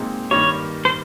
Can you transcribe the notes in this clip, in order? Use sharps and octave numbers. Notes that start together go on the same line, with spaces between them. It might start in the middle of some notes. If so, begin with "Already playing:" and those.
Already playing: A#2 G#3 C4 D#4
G2 D#3 A#3 C#5
C5